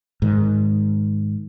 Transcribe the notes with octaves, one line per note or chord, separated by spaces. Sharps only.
G#2 D#3